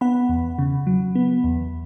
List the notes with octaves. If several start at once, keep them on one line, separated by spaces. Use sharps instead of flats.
B3 F#5 B5
E2
C#3
F#3
B3
E2